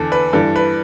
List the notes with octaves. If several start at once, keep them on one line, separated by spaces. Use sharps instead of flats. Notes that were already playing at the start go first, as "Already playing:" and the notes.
Already playing: E2 D3 A4
B4
G2 E3 A4
B4